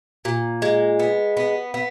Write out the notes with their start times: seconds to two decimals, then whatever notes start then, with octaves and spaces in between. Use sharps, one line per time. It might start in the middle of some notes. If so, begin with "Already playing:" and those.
0.25 A#2
0.62 G#3
0.99 B3
1.37 B3
1.74 B3